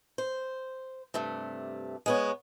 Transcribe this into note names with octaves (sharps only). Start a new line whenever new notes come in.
C5
G2 C3 A3
G#3 B3 C#5